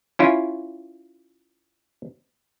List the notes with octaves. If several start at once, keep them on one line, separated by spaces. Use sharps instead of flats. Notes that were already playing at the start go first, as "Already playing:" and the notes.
C#4 E4 F4